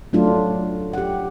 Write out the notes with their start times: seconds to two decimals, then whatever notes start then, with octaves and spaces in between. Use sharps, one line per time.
0.13 F#3 A3 D4 F4
0.93 G4 F#5